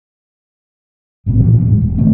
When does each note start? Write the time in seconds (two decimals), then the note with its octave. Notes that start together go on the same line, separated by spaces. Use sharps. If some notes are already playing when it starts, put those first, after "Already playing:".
1.26 A1 G2 B2 C4
1.38 A#2 E3 F#3
1.53 F#1 F#2 A#2
1.67 D#1 G#2 G3
1.82 E1
1.98 E2 D3 A3 C4